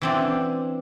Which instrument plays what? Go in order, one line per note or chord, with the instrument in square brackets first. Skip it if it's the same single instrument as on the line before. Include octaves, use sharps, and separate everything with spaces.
[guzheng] E3 C4 D4